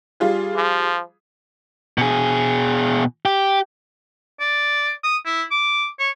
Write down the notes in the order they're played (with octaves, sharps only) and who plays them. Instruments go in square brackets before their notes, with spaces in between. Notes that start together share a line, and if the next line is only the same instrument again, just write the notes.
[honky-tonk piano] G3 F4 G#4
[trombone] F3
[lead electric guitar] B2 G#4
G4
[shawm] D5
D#6
E4
D6
C#5